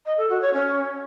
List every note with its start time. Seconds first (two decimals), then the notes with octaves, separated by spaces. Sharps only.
0.06 D#5
0.18 A4
0.30 F#4
0.41 C#5
0.53 C#4